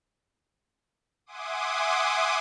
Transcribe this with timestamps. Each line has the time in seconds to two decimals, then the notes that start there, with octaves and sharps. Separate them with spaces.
1.26 E5 F#5 G#5 C6 D6 D#6